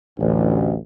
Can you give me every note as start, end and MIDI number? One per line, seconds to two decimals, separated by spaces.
0.19 0.73 33
0.19 0.73 38